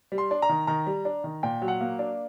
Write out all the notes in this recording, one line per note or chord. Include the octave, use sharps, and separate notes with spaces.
G3
C6
D4
A#5
D#3
D#3 A#5
G3
D4
D#3
A#2 G5
F#3
F#5
A#3
D4